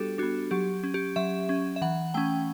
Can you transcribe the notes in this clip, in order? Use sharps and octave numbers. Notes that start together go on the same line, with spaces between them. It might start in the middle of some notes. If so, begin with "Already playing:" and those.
Already playing: G3 B3 D4 F#4 G4 A4
B3 D4 F#4
F#3 G4
C#4
G4
F#3 E5
C#4
E5
E3 F#5
A3 C#4 G5